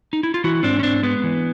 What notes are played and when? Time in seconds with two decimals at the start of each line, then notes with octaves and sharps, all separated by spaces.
0.13 D#4
0.23 E4
0.34 F4
0.44 E3 E4 F#4
0.63 G#2 C4 D4
0.79 C#4
0.83 G#2 C4 D4
1.03 G#3 B3
1.24 E3